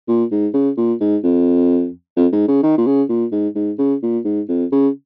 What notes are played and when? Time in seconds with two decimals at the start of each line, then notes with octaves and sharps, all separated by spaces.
0.08 A#2
0.31 G#2
0.54 C#3
0.77 A#2
1.00 G#2
1.23 F2
2.16 F2
2.32 G#2
2.48 C#3
2.63 D#3
2.78 A#2
2.86 C#3
3.09 A#2
3.32 G#2
3.55 G#2
3.78 C#3
4.02 A#2
4.25 G#2
4.48 F2
4.72 C#3